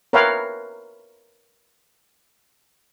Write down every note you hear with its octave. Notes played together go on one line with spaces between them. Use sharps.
A#4 B4 C#5 E5 F5 G5